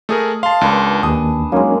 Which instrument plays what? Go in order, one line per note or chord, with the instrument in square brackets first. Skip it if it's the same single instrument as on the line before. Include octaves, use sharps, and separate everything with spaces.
[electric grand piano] A3 G#4 A#4 [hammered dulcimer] D#5
[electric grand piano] F5 A5 [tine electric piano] C6
[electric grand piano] C#2 [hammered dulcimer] D4 B4
[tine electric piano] D#2 [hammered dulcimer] G#4 A5 [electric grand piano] D#6
[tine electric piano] F#3 C#4 D#4 [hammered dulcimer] G#3 A#3